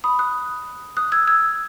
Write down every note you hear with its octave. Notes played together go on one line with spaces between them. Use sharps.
B5 D#6
D#6 F#6
D#6 F#6
E6 G#6
E6 G#6